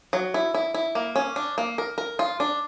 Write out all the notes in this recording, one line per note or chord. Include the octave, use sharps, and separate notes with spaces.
F#3
E4
E4
E4
A#3
C#4
D4
A#3
A#4
A#4
F4
D4